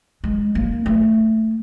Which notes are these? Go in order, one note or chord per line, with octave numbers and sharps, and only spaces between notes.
G#3
A#3
A3